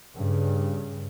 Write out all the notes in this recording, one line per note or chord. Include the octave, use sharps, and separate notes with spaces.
G2 C#3